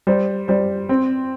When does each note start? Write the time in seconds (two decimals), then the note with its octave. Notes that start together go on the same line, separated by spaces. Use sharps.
0.07 G3 C5
0.48 G3 C5
0.89 C4